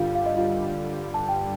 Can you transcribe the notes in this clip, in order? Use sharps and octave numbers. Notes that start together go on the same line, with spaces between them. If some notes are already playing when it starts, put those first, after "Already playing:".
Already playing: G2 D3 G3 F4 G4 F5
F5
D#5
F4 F5
A5
G5